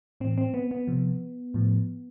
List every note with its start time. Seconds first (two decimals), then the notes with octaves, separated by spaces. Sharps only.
0.20 A2 E3 C4
0.38 C4
0.54 B3
0.71 B3
0.87 C3 F3
1.54 A2 F3